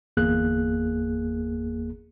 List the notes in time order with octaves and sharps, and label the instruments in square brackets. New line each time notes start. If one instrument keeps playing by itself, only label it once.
[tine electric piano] G1 E2 A#3 G#4 F#6